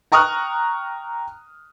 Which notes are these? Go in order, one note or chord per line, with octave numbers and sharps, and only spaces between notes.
G5 A#5 C#6 D#6 F6 F#6